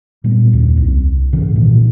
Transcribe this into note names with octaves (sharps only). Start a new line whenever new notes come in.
A#2 G3 B3
D#2 C#3
C2
G#2 C#3 E3
A#2 D#3 E3